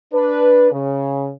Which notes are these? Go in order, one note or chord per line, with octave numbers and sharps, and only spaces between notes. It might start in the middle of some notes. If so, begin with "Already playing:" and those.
D4 B4
C#3